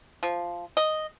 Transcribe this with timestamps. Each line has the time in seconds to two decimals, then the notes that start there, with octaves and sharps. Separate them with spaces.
0.23 F3
0.77 D#5